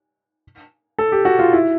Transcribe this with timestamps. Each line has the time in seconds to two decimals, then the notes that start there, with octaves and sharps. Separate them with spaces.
0.98 A4
1.12 G4
1.25 F#4
1.39 F4
1.53 E4